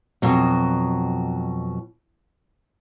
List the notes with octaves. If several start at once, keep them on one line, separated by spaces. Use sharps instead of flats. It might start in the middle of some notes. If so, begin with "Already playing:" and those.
F2 B2 F#3